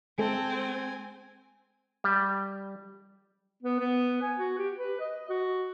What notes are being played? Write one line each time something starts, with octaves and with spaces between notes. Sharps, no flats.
G#3 C4 A4 G#5
G3
B3
B3
G#5
F#4
G4
B4
D#5
F#4